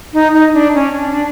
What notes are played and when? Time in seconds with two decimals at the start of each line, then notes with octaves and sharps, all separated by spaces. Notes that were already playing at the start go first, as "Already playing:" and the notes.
0.14 D#4
0.34 D#4
0.54 D4
0.75 C#4
0.95 D4
1.11 D4